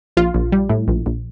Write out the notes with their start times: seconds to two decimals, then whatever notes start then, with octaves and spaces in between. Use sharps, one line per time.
0.17 A#1 F4
0.34 A#1
0.52 G3
0.69 A2
0.88 A#1
1.06 A#1